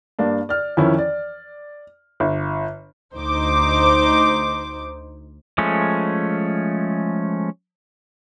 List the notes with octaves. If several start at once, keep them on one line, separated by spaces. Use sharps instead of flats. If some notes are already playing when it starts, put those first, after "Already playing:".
G2 A#3 D4
D5 F6
F2 D#3 E3 C#4 E4
D5
G1
D2 D#4 C5 D6
F3 G#3 A3 C#4